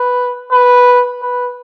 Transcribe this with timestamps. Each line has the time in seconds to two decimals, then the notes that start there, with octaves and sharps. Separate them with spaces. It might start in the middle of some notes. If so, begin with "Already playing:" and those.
Already playing: B4
0.52 B4
1.22 B4